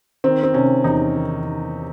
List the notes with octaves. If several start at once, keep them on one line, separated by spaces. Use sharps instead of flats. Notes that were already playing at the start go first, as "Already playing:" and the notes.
D#3 C4
C4
C3 C#4
E2 D#4
D#3
D#3